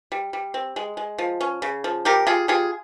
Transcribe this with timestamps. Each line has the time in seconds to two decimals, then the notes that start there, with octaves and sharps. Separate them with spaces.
0.12 G3
0.33 G3
0.54 C4
0.76 G#3
0.97 G#3
1.18 F3
1.41 C#4
1.62 C#3
1.84 F3
2.05 G3 G4 A#4
2.26 G3 F4 G#4
2.48 G3 F4 G#4